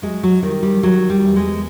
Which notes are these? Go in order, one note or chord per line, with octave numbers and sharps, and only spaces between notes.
F#3 G#3
F#3
D#3 G3
G3
D#3 F#3
G3
E2
G#3